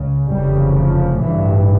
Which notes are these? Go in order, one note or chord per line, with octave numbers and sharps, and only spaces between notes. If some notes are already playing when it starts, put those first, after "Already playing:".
Already playing: C#2 C#3
F1 E2 C#3 G3
F3
A1 G2 E3